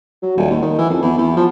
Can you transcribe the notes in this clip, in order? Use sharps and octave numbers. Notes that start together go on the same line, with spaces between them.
F#3
D#1
D#2
D#3
E3
F2
E2
E2
F3